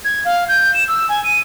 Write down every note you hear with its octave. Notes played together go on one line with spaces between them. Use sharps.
G#6
F5
G6
E7
E6
G#5
D#7